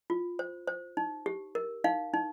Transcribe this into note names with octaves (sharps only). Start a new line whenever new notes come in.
F4
C5
C5
D#4
G4
A#4
D#4 F5
D#4